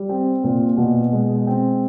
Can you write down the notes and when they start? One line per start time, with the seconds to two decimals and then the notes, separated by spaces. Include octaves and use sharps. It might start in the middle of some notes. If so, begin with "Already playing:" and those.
Already playing: G3
0.09 C4
0.44 A#2
0.77 B2
1.13 G#3
1.47 C4